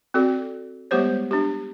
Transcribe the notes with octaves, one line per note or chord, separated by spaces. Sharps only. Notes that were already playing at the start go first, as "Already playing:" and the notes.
C4 F#4 A4 D5
G3 G#3 B3 G4 C5 C#5
D4 G4